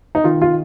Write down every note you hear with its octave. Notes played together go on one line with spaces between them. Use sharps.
D#4
D#3 F4
F4